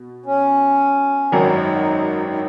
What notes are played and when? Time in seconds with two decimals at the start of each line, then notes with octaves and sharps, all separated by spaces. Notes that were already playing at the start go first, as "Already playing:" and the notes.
Already playing: B2
0.26 C#4
1.32 G#1 F#2 D#3 F#3 D#4
2.27 D#4